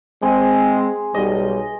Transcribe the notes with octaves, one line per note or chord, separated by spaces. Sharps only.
G#3 C4 G#4 C6
B1 G3 D#5